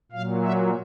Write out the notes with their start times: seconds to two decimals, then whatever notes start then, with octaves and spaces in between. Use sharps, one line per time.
0.12 A#2 F#3 F5
0.43 E5